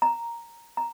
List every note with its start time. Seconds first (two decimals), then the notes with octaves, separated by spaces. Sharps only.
0.02 A#5
0.77 A#5